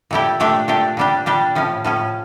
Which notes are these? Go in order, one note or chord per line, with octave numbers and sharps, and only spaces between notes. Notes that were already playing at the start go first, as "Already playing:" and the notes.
A#2 A3 E4 G4
A#2 A3 D4 G4
A#2 A3 D4 G4
A#2 G3 D4 G4
A#2 G3 D4 G4
A2 F3 C#4
A2 F3 C#4